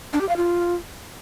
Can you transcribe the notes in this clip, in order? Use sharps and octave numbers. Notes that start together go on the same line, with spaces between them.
D4
G4
F5
F4